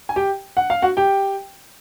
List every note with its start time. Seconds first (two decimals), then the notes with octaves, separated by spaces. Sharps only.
0.09 G#5
0.16 G4 G5
0.57 F#5
0.70 F5
0.82 F#4 F#5
0.97 G4 G5